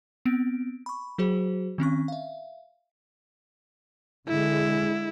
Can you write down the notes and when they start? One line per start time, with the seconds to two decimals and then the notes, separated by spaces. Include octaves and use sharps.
0.26 B3 C4 D7
0.86 B5 C#6
1.18 F#3 F#4 G#4 C5
1.78 D#3 C4 C#4 C#6
2.08 E5 F5
4.28 D3 G#3 E4